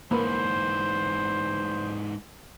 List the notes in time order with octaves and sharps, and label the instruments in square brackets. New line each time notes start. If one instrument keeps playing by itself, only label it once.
[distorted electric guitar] G#2 E3 [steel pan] A#3 B4 [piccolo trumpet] C5